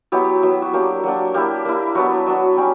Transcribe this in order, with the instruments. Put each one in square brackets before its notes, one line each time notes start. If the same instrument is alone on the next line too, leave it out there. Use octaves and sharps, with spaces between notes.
[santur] F#3 B3 E4 G4
F#3 B3 E4
F#4
F#3 A#3 D4 G4
F#3 A#3 D4
A#3 E4 G4
A#3 E4
F#3 B3 D4 F#4
F#3 B3 D4
G3 C#4 G4